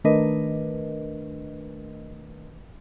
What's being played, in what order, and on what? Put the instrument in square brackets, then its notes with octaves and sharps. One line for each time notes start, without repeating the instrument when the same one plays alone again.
[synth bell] D#3 A3 D4 A#4 B4 D#5